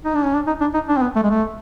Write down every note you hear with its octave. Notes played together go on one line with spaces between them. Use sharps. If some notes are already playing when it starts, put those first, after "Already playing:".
D#4
D4
C#4
D4
D#4
D4
D#4
D4
C4
B3
A3
G#3
A3